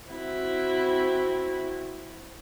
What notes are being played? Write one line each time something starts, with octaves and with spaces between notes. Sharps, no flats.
C4 E4 F#4